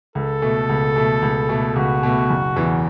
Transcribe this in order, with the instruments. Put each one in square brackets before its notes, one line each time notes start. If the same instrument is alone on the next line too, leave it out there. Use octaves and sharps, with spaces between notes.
[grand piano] C#2 [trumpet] A4
[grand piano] B2 A3
C#2
B2 A3
C#2
B2 A3
[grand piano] C#2 [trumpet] F#4
[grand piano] B2 A3
F#1
E2 E3